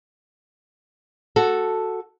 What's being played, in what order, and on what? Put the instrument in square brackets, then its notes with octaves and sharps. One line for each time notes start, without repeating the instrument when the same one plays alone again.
[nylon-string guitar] F#4 A4